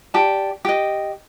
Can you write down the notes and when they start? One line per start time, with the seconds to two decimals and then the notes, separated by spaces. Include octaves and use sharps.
0.14 G4 D5 A5
0.65 G4 D#5